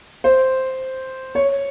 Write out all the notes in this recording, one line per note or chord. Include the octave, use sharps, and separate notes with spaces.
C5
C#5